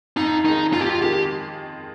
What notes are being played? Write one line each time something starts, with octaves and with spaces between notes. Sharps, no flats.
F2 D#4
D#3 G#3 D#4
F2 F4
G4
F4
D#3 G#3 G4